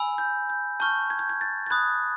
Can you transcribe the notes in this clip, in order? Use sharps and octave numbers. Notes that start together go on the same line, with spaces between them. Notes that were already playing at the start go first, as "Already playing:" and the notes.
Already playing: G#5 B5 E6
G6
G6
A5 C#6 F6 G6
G#6
G6
G#6
A6
A6
B5 D#6 F#6 G#6